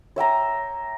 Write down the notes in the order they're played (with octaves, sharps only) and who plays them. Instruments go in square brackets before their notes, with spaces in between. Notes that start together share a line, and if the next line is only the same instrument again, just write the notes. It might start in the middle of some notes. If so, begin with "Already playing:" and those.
[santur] C#5 E5 G5 A#5